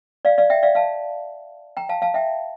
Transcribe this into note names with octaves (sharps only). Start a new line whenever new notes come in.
D5 F5
D5 F5
E5 G5
D5 F5
F5 A5
G5 A#5
F5 A5
F5 A5
E5 G5